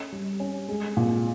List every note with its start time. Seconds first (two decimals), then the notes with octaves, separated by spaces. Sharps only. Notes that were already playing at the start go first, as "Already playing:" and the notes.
Already playing: C#4
0.12 G3
0.40 C#4
0.69 G#3
0.97 A#2